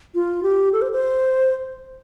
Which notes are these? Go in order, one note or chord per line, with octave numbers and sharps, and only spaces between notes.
F4
G4
A4
C5
C5